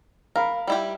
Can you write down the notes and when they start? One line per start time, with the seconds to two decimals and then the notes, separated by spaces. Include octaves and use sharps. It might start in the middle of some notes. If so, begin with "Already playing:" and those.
0.36 A#4 F5 B5
0.67 G3 E4 G4